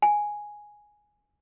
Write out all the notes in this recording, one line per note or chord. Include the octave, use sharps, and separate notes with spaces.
G#5